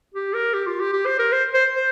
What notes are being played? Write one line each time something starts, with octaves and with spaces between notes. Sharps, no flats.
G4
A#4
G4
F4
G4
G4
C5
A#4
C5
C5
C5